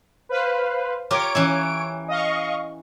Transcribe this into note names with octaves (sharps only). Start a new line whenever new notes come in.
B4 C5 F5
F4 G4 A#4 C#5 D7
E3 C#4 E4
D#5 F5 C#6